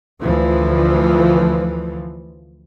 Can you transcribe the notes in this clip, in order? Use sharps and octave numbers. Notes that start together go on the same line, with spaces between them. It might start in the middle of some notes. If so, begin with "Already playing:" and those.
D2 E3 F3